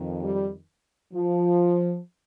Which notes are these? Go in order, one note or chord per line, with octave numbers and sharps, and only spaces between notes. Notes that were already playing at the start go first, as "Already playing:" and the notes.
Already playing: F2 D#3
G3
F3